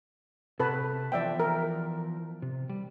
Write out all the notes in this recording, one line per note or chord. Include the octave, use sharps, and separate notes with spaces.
C3 G4 A4 B4 A5
E3 F3 B3 D5 E5 G5
A#4
C3
G3